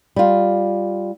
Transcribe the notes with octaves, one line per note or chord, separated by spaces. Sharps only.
G3 F4